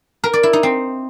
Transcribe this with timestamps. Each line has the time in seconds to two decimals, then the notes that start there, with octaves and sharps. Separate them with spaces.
0.24 A#4
0.33 D5
0.43 E4
0.53 D#4
0.63 C4